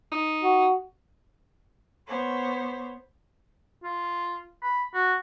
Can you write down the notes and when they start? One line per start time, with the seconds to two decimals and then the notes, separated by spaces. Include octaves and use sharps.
0.12 D#4
0.43 F#4
2.07 B3 C5 C#5
3.83 F4
4.62 B5
4.95 F#4